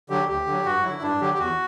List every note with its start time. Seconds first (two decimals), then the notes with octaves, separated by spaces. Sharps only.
0.10 D3 F#3 G4
0.28 D2 G4
0.46 D3 F#3
0.65 G2 F#4
0.83 D3 F#3 E4
1.02 G2 D4
1.21 D3 F#3 G4
1.34 G4
1.39 E2 F#4